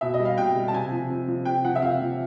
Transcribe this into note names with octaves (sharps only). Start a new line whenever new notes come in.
B2 E5
D#5
G3
F5
B2 G5
G3
A5
C3 G#5
F3
C3
F3
C3 G5
F3 F#5
E5
C3 F5
F3